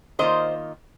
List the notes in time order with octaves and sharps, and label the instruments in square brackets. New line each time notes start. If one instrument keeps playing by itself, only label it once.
[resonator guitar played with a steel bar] D#3 A#3 F4 C5 D#5